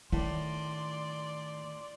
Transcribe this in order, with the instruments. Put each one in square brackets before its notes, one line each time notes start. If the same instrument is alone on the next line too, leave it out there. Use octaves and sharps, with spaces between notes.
[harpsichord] A2 [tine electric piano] D#3 A5 [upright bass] A3 [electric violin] D5 C6